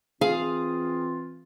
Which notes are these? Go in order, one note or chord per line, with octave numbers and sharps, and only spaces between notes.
E3 C4 F4 G#4 F5